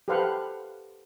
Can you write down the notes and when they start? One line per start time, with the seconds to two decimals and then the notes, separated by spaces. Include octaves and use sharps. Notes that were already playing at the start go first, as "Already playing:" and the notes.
0.08 G4 A4 B4 C5 F5 F#5